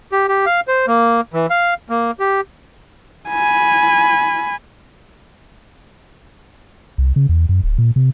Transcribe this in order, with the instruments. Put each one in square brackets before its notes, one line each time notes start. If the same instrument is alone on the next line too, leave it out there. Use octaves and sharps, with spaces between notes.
[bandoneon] G4
G4
F5
C5
A#3
E3
F5
A#3
G4
[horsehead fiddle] G#5 B5
[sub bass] C2
C#3
E2
F#2
D1
A#2
C3